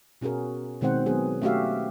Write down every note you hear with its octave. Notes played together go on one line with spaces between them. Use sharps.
B2 C#4 F#4 G#4 A#4
B2 D#3 G#3 C4 C5 F#5
F#3 B3 G#4
A3 C#4 F#4 G4 E5 F5